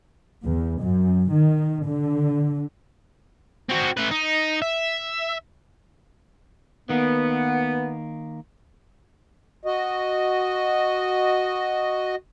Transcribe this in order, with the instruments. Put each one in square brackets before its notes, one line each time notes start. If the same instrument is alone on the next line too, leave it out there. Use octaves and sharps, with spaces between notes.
[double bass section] E2
F#2
D#3
D3
[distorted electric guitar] C4 F#4
A3 B4
D#4
E5
[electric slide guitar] D#3 A#3 [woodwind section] B3
[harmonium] F#4 D#5